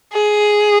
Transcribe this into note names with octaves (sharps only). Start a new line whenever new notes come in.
G#4